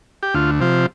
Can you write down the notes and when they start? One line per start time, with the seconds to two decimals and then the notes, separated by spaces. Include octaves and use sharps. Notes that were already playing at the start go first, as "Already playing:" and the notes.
0.23 G4
0.34 D2 F4
0.60 C3 F3